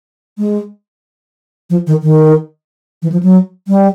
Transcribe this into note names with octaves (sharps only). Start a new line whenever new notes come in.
G#3
F3
D#3
D#3
E3
F3
F#3
G3